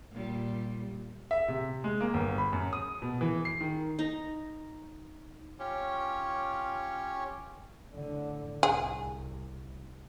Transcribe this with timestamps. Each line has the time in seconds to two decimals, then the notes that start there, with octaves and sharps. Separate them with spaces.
0.11 A#2 G3
1.31 E5
1.48 C3
1.84 G#3
2.01 A#3
2.14 G1
2.38 B5
2.53 F#2
2.73 D#6
3.02 B2
3.21 E3
3.45 C7
3.61 D#3
3.99 D#4 A#5
5.59 C#4 F4 G4 C#5
7.93 A2 D3
8.63 C2 G#4